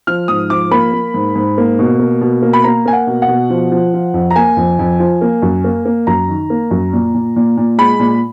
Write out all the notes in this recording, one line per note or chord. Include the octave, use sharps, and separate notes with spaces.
F3 F6
G#2 D#6
F3 D6
A#3 B5
A#3
G#2
G#2
A#3
B2
A#3
B2
A#3
B5
A#3 A#5
A#3 G#5
F#5
B2
F#5
B2
F3
F3
F3
F2
A#5
A#3 G#5
F2
F2
F3
A#3
F#2
A#3
A#3
F#2 A#5
D#3
A#3
F#2
A#2
A#2
A#2
A#2
G#3 B5
A#2